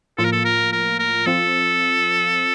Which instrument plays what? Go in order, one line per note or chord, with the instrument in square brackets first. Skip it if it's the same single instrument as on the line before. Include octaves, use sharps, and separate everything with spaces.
[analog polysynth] A2 F3 A#3 F4 [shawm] A4
[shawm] A#4
A4
A#4
A#4
A#4
[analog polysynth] F3 C4 F4 [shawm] A4